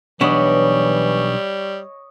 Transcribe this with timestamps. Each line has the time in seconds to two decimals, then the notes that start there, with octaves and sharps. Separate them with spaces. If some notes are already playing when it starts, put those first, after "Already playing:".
0.21 B1 E3 G3 B3 D4 C#5 D#5